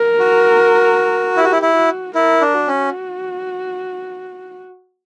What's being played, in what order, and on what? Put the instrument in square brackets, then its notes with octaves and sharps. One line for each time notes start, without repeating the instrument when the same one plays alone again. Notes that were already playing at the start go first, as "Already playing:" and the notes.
Already playing: [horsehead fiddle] A#4
[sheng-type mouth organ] F#4
[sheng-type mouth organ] E4 [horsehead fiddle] G4
[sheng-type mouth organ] F#4
E4
E4
[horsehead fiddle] F#4
[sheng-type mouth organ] E4 [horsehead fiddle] A#4
[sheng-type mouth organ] D4
[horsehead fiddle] F#4
[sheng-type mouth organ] C#4